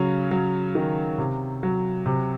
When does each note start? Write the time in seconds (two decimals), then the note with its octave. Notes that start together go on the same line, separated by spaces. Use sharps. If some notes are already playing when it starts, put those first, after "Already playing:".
Already playing: C#3 F#3 C#4
0.31 F#3
0.75 D#3
1.18 C3
1.63 F#3
2.06 C3